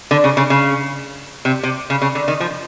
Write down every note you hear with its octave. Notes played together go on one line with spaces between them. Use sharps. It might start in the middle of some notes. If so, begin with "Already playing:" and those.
D3
C#3
C#3
C#3
C3
C3
C#3
C#3
D3
D#3
F3